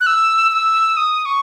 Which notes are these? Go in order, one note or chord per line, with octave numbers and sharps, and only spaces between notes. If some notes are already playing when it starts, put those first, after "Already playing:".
F#6
E6
E6
D#6
C#6